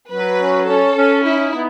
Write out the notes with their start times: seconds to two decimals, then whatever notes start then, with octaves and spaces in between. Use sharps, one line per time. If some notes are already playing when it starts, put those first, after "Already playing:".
0.10 F#3 B4
0.40 C#4
0.67 C#4 A4
0.96 C#4
1.24 D#4 E4
1.54 B3